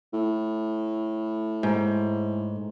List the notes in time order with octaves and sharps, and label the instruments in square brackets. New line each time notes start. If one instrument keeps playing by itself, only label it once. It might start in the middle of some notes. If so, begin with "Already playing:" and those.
[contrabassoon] A2
[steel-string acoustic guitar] G#2